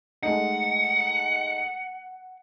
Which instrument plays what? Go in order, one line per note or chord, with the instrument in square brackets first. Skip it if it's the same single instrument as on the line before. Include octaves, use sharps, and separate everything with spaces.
[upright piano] G#3 A3 D#4 [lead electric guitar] F#5